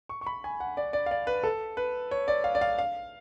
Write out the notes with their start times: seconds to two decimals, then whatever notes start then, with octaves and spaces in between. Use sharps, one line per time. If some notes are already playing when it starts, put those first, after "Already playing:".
0.09 C#6
0.21 C#6
0.27 B5
0.44 G#5
0.60 F#5
0.77 D5
0.93 D5
1.06 F5
1.11 D5
1.27 B4
1.44 A4
1.77 B4
2.11 C#5
2.28 D5
2.44 F5
2.55 D5
2.61 F5
2.78 F5